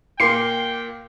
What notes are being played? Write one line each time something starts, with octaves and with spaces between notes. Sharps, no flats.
A#2 A#3 G5 C6 C7